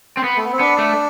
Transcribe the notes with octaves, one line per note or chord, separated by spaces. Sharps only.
C4
B3
A3
B3
C4
B3 D4
A3